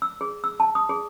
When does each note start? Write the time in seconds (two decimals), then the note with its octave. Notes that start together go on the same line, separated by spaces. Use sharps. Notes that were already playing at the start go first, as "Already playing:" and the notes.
0.02 E6
0.21 G#4
0.44 E6
0.60 A5
0.75 D#6
0.89 G#4